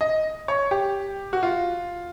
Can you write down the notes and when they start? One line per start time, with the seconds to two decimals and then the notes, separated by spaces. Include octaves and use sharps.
0.01 D#5
0.48 C#5
0.71 G4
1.33 F#4
1.43 F4